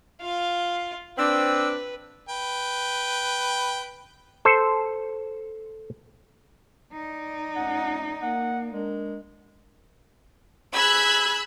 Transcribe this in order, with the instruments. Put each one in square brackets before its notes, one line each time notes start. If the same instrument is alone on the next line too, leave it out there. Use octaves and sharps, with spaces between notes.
[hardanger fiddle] F4 F5
[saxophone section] C4 D4 [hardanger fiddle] B4 [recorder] E6
[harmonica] B4 G5
[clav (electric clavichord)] A4 C5
[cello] D#4 D5
[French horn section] F2 A3 C#4 [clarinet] F#5
[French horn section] A#3 [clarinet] F#5
[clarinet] G#3 [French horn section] D4 A#4
[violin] G#4 G#6 [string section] B5 E6 F#6